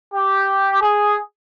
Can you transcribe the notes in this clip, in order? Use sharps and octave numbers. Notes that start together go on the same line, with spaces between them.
G4
G#4